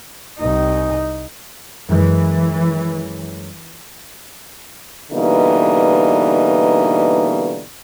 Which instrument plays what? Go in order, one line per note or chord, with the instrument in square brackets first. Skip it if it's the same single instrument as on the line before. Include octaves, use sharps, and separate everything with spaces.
[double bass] C2 D#4
[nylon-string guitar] F#2 G#3 [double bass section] E3
[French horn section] B2 D3 E3 G3 A#3 D#4